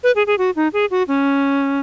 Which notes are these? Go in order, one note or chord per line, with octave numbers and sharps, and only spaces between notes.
B4
G#4
G#4
F#4
D#4
G#4
F#4
C#4